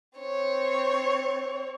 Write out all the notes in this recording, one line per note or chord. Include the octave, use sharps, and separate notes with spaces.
C4 C#5